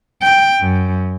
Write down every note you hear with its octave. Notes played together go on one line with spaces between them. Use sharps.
G5
F#2